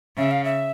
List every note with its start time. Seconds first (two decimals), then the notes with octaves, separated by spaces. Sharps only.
0.17 C#3 E5
0.31 F5
0.45 E5